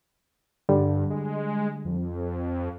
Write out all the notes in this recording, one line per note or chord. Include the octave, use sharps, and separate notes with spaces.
G2 D3 G3
G#3
F2